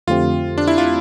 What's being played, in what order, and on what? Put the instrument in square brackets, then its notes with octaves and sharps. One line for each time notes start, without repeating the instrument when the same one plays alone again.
[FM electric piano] F2 D3 A3 C4 G4 [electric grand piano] F4
[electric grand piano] D4
E4
F4